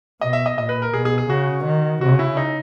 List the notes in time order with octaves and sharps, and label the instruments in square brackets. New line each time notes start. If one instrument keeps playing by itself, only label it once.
[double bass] B2 [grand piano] D#5
[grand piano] E5
D#5
[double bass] A#2 [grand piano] D#5
[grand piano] B4
A#4
[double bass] B2 [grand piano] G#4
[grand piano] G#4
G#4
[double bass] C#3 [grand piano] F#4
[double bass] D#3
[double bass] C#3 [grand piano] F#4
[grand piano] E4
D#4